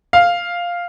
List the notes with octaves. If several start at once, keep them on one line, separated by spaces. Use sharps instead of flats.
F5